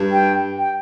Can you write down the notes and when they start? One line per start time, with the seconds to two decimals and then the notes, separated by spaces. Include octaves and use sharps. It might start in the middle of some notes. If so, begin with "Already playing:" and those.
Already playing: G2
0.12 G5
0.58 G5